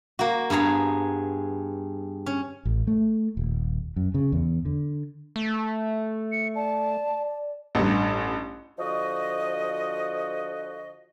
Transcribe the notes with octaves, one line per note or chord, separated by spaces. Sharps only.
A#3 F#4
G2 B3 G#4 A#5
C#4
A1
A3
D#1
F#2
C#3
E2
D3
A3
C#7
D5 A5
A1 G2
D3 F3 F#4 D#5